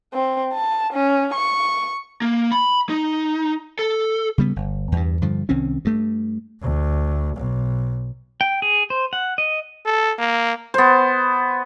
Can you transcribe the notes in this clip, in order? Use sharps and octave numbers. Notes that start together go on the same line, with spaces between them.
C4
A5
C#4
C#6
A#3
B5
D#4
A4
C#3 G3 B3
G1
E2 G2
G2 D3 F3
C2 D#3 C4 C#4
G2 A3
D2
B1
G5
G#4
C5
F#5
D#5
A4
A#3
B3 C5